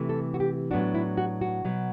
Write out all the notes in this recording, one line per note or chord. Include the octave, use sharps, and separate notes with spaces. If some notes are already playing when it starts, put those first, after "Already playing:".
Already playing: C3 E3 A3
A4
F#4
G4
A2 F#3 B3 D4 F#4
E4
F#4
F#4
B2 F#3 B3